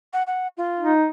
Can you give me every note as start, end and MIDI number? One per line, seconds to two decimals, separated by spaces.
0.13 0.23 78
0.27 0.48 78
0.57 0.91 65
0.79 1.08 63